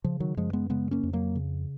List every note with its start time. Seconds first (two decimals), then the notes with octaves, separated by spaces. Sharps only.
0.04 C#3 F3
0.20 D#3 F#3
0.37 F#2 F3 G#3
0.53 G#3 B3
0.70 C#3 G#3 B3
0.91 A#3 C#4
1.03 F2
1.13 F#3 A#3
1.36 C#3